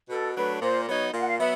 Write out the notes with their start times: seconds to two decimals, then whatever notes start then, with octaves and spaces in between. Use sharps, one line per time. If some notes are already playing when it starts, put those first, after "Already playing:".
0.09 B2 A4
0.35 F#3 A3 D4 B4
0.61 A#2 C5
0.87 F#3 B3 D#4 C#5
1.13 A#2 F5
1.19 F#5
1.26 F5
1.38 F#3 B3 E5